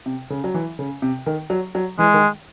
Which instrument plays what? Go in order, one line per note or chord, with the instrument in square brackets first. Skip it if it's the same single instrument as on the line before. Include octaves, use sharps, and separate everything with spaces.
[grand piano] C3
C#3
F#3
E3
C#3
C3
D#3
F#3
F#3
[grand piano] E3 [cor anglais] G#3
[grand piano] D#3